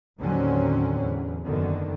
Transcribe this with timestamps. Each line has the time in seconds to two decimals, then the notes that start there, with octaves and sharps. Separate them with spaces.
0.18 D#2 A2 D3 F#3 C4 C#4
1.02 E2
1.44 F#1 F#2 D3 D#3 B3